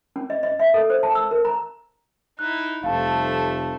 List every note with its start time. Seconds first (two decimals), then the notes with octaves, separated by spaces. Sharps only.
0.16 C#4
0.30 D#5
0.43 D#5
0.59 E5
0.74 A4
0.90 C5
1.03 A5
1.15 E6
1.31 A#4
1.45 A#5
2.39 D#4 E4 F#6
2.83 F1 G3 A3 C5 F5 A5